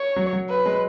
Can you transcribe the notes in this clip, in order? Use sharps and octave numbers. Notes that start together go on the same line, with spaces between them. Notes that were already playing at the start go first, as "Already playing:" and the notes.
Already playing: C#5
F#3
F#3
B4
G#3